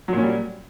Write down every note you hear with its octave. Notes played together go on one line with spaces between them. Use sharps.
A#2 F#3 G3 C#4